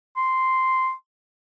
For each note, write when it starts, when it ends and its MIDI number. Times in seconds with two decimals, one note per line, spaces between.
0.17 0.92 84